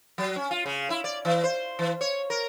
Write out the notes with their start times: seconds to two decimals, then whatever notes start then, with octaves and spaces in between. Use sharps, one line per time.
0.18 F#3
0.36 C#4
0.51 F4
0.66 C#3
0.90 E4
1.04 D5
1.25 E3
1.44 C5
1.79 E3
2.01 C#5
2.30 A#4